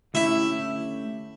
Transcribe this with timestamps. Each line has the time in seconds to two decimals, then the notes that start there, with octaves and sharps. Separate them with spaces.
0.14 D3 A3 C#4 E4 G4